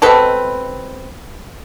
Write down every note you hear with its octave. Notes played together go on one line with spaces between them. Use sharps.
B2 G#3 C4 A4 B4